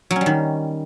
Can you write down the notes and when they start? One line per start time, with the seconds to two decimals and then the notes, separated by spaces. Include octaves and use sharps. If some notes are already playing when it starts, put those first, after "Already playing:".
0.11 F#3
0.16 C#4
0.21 G3
0.26 D#3